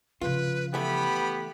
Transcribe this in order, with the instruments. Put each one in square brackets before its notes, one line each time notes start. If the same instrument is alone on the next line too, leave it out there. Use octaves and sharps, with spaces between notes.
[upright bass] C#3 F3 [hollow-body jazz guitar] F4 [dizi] B4
[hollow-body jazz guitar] E3 A3 [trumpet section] B3 G4 [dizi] B5